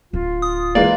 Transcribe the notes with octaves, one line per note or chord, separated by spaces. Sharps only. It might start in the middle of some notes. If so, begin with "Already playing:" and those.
D1 F4
D#6
E3 G#3 A#3 D5